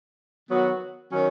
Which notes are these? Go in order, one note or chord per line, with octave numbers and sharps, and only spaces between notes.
D#3 F#3 B3 F#4
D#3 F#3 C#4